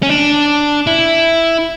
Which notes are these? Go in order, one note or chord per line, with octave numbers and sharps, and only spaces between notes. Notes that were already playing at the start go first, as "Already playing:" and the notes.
C#4
D4
E4